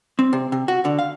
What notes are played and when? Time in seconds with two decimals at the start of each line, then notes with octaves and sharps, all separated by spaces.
0.19 C4
0.33 C3
0.52 C3
0.68 F#4
0.85 D3
0.99 F5